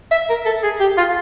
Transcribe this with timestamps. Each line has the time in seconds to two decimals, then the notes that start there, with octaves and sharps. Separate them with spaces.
0.11 E5
0.29 A#4
0.46 A4
0.64 G#4
0.80 G4
0.98 F4